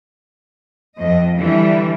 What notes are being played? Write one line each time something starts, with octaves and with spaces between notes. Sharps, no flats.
F2 D#5
D3 E3 G3